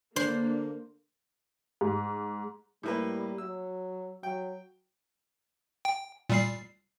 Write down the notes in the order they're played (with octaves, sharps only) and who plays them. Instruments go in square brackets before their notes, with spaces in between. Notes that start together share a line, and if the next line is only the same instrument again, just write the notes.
[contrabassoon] D3 [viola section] A#3 [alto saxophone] D4 [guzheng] C5
[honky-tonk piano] G#2
[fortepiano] A2 A#3 B4 [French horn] G3
[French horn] F#3 [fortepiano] E6
[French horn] F#3 [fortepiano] G5
[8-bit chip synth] G5
A#2 G3 C7